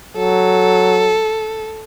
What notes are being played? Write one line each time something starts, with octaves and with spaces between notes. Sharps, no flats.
F#3 A4